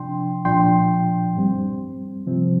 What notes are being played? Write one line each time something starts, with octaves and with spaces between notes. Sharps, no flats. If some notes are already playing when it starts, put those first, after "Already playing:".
Already playing: C3 F3 D4 G5 C6
C2 A#2 F3 D4 G5 C6
G2 G3 C4
C3 F3 C4